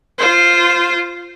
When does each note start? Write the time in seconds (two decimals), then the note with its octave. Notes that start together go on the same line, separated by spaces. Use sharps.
0.18 F4 C5